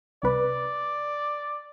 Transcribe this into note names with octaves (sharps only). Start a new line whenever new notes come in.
C2 B4 D5